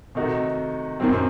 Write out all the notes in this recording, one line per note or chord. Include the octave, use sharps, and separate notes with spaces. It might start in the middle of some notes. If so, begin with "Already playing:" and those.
C3 D#3 A3 D#4 F#4
F#2 D#3 F#3 C4